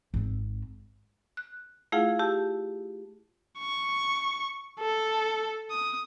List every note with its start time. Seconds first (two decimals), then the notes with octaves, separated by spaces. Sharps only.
0.14 G#1 C4
1.37 F#6
1.92 A3 E4 F4 G#4 F5 F#5
2.19 G4 A5 E6
3.59 C#6
4.80 A4
5.71 D#6